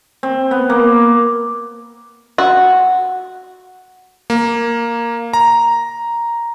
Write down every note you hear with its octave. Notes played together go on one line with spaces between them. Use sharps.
C4
B3
A#3
F#4
A#3
A#5